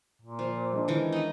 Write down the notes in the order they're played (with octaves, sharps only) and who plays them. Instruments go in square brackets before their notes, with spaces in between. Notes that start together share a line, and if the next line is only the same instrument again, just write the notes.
[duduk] A#2
[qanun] F3
[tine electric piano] G#3 D4
[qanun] D#3 E3
D#4 B4